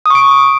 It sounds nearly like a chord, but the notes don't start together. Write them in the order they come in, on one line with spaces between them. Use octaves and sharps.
D#6 C#6 D7